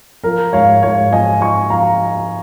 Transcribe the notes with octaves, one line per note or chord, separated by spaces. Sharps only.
F3 F4 A#4
G#2 C#5 F5
G#2 C#5 F5
F3 D#5 G#5
F3 G#5 C#6
F3 F5 A#5